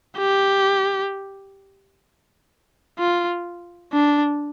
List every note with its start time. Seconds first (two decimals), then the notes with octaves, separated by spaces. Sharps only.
0.18 G4
2.99 F4
3.92 D4